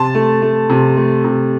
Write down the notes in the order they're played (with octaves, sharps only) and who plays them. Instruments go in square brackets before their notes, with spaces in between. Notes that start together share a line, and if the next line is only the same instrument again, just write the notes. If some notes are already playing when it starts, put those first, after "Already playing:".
Already playing: [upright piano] C3 A5 C6
A3
A3
C3
A3
C3